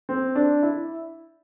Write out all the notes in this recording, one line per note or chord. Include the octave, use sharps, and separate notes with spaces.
C4
D4
E4